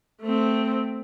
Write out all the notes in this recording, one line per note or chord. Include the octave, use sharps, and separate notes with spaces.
A3 C4